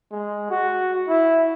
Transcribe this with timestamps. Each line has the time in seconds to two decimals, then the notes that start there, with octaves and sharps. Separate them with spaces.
0.11 G#3
0.50 F#4
1.08 E4